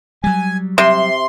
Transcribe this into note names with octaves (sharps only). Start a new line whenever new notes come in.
F#3 G3 G#5
C3 E5 C6